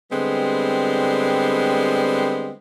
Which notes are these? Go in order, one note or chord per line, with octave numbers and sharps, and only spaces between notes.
D3 G3 G#3 B3 C4